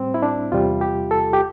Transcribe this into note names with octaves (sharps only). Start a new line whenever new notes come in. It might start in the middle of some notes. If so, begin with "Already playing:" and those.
Already playing: A2 G3 C4
E4
D4
E2 C3 G3 F4
G4
A4
G4